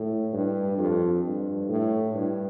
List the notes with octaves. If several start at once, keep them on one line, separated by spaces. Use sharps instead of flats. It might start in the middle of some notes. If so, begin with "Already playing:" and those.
Already playing: A2
G2
F2
G2
A2
G2